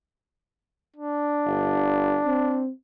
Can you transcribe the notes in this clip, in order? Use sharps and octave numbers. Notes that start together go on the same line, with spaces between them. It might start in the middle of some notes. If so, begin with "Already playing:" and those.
D4
G1
C4